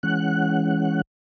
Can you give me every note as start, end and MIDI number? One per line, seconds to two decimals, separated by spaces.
0.03 1.01 52
0.03 1.01 56
0.03 1.01 61
0.03 1.01 78
0.03 1.01 90